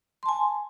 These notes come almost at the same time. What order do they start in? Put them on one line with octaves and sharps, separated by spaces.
C6 A5 G#5